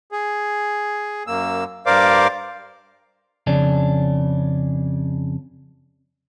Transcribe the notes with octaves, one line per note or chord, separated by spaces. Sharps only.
G#4
F#2 A#3 E6
G2 A#4 C5 D5 F5 D6
F2 C#3 C#4 D4